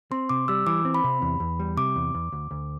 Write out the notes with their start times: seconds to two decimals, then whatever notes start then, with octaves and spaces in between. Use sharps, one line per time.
0.12 C4 C6
0.29 C3 D6
0.48 G3 E6
0.66 E3 D6
0.85 C4
0.94 B5
1.04 C3
1.22 E2
1.40 E2
1.59 G3
1.77 C3 D6
1.96 E2
2.14 E2
2.32 D2
2.51 D2